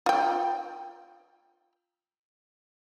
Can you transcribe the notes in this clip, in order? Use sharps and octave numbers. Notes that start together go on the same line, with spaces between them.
F4 G5